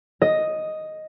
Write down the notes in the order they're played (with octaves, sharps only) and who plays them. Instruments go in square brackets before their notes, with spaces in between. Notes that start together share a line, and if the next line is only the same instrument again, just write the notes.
[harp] D#5